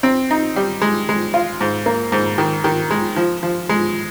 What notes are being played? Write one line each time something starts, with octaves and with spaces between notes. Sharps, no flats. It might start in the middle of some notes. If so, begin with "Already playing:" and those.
C4
D#4
G3
G#3
G#3
F4
G#2
A#3
G#2
D#3
D#3
G#3
F3
F3
G#3